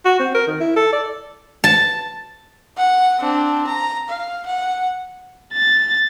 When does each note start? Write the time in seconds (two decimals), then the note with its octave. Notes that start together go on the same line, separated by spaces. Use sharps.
0.05 F#4
0.20 C4
0.35 A#4
0.47 D#3
0.60 E4
0.76 A4
0.93 D5
1.64 A5
2.77 F#5
3.20 C4 D4
3.67 A#5
4.09 F5
4.46 F#5
5.53 A6